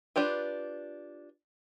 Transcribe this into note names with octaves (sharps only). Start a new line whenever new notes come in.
D4 F4 G4 B4